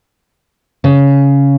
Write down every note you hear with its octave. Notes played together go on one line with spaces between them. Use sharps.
C#3